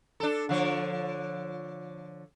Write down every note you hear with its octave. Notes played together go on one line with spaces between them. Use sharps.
D4 A4
D3 F3 C#5